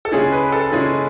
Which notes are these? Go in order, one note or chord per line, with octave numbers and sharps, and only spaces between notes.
A4
C#3 G#3 C#4 E4 G#4
B4
A4
C#3 G#3 C#4 E4 G#4